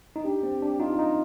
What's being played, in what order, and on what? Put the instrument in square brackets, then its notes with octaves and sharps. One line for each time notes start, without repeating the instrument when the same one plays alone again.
[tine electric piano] D#4
[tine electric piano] D4 [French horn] G4
[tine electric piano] C4
D4
[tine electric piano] D#4 [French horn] F4
[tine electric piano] D#4